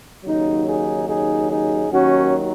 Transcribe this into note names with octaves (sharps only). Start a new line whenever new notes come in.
D#2 C#3 F#3 D#4
D#4 G#4
D#4 G#4
D#4 G#4
D#2 D#3 F#3 C#4 F#4